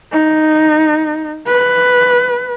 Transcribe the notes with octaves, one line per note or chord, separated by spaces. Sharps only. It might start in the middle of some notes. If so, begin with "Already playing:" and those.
D#4
B4